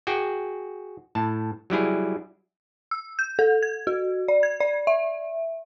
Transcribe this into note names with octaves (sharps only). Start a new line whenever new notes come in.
F#4 G#4 G5
A2 A5
F#3 G3 E4 G#4
E6
G6
A4
G#6
F#4
D5
G#6
D5
E5